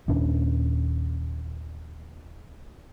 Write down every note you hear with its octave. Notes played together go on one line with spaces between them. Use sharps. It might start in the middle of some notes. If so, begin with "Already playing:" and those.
D#2 A#2 C#4 D4